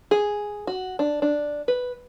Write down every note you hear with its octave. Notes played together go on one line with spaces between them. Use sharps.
G#4
F#4
D4
D4
B4